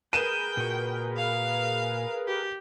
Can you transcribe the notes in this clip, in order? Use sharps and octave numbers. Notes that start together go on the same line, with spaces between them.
G#4 A#4 B4 G5 D#7 E7
A#2 F#4
F5
G4